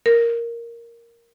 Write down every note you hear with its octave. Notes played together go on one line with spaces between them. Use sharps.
A#4